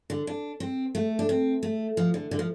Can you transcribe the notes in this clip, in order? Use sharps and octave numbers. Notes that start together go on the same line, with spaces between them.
D3
D4
C4
A3
D4
C4
A3
F3
D3
D3
F3